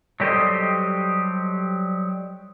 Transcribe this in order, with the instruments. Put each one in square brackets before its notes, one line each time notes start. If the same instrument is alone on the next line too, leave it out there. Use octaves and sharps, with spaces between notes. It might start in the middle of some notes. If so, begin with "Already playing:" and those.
[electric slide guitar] F#3 G3 G4 A4 C5 D#5